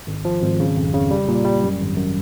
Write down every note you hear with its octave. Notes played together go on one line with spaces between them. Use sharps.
G#1
F3
G#1
C#3
F2
C#3
G3
A#2
G3
F#2
G#1
F#2